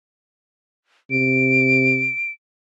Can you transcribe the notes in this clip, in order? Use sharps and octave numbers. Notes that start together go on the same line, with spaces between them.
C3 D7